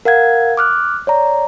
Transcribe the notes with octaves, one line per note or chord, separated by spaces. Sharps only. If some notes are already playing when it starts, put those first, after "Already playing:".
A#4 F5 F#5 G#6
D6 F6 F#6
C#5 D5 A#5